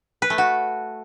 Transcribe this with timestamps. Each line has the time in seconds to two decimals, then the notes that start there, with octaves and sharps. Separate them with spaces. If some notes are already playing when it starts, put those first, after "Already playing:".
0.22 B4
0.30 A3
0.38 F#4